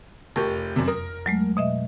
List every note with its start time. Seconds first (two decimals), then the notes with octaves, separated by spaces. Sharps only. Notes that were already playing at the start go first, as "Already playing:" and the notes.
0.36 F1 F2 G4 A#4 C#6
0.76 F#2 C3
0.88 A#4 D#6
1.26 F#3 G#3 A3
1.57 B2 D#5 E5